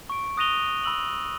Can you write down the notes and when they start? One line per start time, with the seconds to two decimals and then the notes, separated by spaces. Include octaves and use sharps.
0.10 C#6 D7
0.37 D#6 F#6 A#6 D#7 F7 G7
0.84 B5 E6 F#7